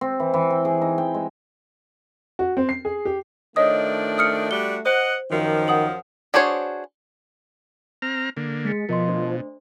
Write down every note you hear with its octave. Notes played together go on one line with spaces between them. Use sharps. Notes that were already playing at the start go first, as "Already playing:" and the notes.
C4
E3
E3
G5
G#4
D#4
G5
G#3
F#4
C4
C7
G#4
G4
D#3 F3 A3 D4 C#5 D#5 D#6
D#6 F6 C#7
G3 D4 F#4 G7
C5 D#5 F#5
F#2 D#3 F3
F#5 D#6 F#7
D4 F#4 G#4 C5 C#5
C4 A#5 F6
D3 A#3
G#3 A6 B6 C#7
B2 F3 A#4 D#5 C6
A3 D4 C5